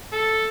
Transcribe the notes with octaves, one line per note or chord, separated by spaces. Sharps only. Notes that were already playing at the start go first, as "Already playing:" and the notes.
A4